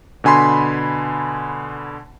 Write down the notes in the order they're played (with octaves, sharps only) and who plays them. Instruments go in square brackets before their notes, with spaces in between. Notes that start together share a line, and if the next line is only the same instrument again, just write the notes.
[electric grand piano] B2 D3 G#5 B5 C6